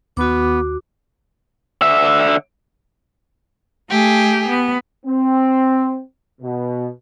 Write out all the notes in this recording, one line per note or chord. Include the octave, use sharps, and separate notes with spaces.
D#2 B3 F#4 D6
D3 E5
A3 G4 G#4
B3
C4
B2